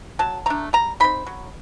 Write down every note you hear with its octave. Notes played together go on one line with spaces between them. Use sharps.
F#3 A5
A3 D4 A#5
G3 A#5
C4 D#4 B5
F#3